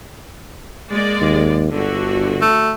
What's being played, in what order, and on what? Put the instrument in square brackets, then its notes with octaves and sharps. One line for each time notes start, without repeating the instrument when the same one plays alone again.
[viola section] G#3 A#3 D5
[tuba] D#2
[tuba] G1 [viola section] D3 F#4
[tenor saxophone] A3